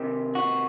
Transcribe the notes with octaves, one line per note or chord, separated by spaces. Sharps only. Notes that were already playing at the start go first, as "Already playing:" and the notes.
Already playing: C3 D#3
F#4